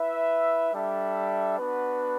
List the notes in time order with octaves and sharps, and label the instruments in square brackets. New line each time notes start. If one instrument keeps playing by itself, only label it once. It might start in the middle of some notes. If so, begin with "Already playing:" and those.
Already playing: [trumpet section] E4 B4 E5
G3 D4 A4 E5
B3 D4 F#4 B4